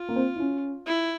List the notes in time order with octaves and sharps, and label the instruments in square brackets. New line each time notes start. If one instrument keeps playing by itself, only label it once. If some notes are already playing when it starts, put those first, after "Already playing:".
Already playing: [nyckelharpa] F4
[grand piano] A#3
C4
E4
C#4
[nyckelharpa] E4